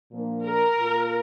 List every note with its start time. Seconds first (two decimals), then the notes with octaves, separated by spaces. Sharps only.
0.12 A#2 F3 A#3 D4
0.45 A#4
0.78 A#2 A#3 F4